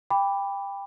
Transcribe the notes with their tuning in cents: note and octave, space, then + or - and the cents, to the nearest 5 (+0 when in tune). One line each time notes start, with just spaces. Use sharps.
G5 +20 B5 +0 D6 -5